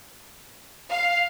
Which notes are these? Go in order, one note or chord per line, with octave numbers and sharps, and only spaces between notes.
F5